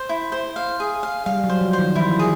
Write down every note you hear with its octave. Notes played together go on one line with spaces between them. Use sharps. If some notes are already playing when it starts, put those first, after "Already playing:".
Already playing: C5
E4
C5
F5
G#4
F5
G3 F5
F#3
C5
F3
C5
D#3
E3 E4
G#4